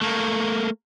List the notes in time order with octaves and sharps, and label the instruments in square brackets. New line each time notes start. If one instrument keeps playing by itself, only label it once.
[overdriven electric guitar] A3 A#3